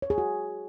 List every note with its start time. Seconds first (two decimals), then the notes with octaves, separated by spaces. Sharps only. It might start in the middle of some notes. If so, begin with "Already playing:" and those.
0.02 C#5
0.10 G#4
0.18 F#4